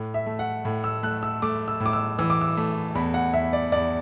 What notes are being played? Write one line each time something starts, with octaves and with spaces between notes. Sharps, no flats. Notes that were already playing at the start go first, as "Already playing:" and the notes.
Already playing: A2
E5
A3
F#5
A2
E6
A3 F#6
E6
A3 D6
E6
A2
D6
E6
E3 E6
D6
E6
A3
E2 B5
F#5
E2 E5
D5
E2 D5